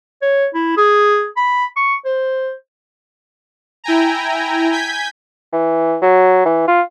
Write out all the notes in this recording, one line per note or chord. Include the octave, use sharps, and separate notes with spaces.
C#5
E4
G#4
B5
C#6
C5
E4 G5 G#5 A#5
G#5 G6 G#6 B6
E3
F#3
E3
F4